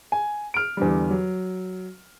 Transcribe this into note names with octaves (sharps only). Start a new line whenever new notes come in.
G#5
F6 D7
E2 D3 G3
F#3